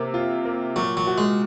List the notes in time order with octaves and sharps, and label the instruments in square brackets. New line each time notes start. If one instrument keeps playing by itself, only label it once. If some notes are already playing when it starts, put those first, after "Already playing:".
Already playing: [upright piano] C3 A#3
F4
A#3
[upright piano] A#2 [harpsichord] F#3
[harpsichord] F#3
[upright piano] F#4
[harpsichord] G#3